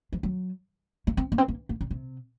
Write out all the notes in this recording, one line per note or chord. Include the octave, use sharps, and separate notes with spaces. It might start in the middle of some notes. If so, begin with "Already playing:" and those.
F3
F#3
A#3
C4
A#3
C4
A#3
A#3
C#3
C3